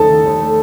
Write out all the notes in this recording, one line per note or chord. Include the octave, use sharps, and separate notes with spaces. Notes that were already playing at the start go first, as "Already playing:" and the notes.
Already playing: D#2 A3 D#4 A4 A5
D#3
D#2
A3